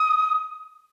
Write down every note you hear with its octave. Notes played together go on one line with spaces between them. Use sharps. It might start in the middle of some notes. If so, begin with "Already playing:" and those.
Already playing: D#6